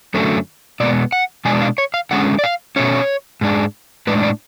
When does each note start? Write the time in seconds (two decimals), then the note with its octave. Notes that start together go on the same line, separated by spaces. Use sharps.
0.14 F#2 D3 F#3 A3 C#4
0.80 B2 G#3 B3 D5
1.12 F#5
1.45 B2 G#3 D4 G#5
1.62 F5
1.78 C#5
1.94 F5
2.11 D3 G#3 C#4 F#5
2.39 D5
2.44 F5
2.76 B2 A3 C#4 C#5
3.41 G#2 G#3 D4
4.07 A2 G#3 D4 B4
4.23 D5